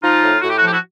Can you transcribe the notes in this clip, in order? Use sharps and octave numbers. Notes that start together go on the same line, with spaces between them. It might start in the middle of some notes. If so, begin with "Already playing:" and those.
F3 D#4 F4
A2
A2 F#4
G4
F#4
F3 G4
E4 F#4